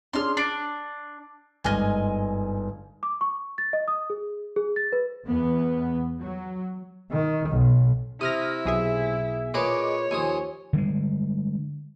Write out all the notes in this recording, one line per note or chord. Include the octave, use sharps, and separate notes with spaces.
C#4 D4 G#4 C6 F6
D4 C7 D7
G1 G#2 D#5 G#5 F6
D6
C#6
A6
D#5
D#6
G#4
G#4
A6
B4
E2 B3
F#3
D#3
B1
C3 E4 D#6 F6 A#6
B1 G#4 E5
A#2 G#4 B4 C#5 D#5 D6
D#2 F3 G#5 D#6
D3 G3 G#3